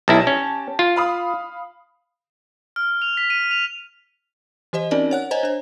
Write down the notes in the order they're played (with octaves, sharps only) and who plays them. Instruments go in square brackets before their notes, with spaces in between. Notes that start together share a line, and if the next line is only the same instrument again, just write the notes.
[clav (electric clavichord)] B1 E4 [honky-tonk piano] G4 A5 A#6
[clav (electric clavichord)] C#4
F4
[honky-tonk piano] F5 B5 D#6
[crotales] F6
F7
B6
D#7
F7
[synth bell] E3 G4 C5 D#5
C4 C#4 D#4 F#4 A#4 D5
C#5 F#5 F#6
C5 C#5 D#5 G#5 A#5
D4 C5